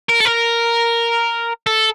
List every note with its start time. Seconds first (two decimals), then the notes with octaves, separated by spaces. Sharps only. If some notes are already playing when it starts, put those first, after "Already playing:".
0.09 A#4
0.21 A4
0.25 A#4
1.67 A4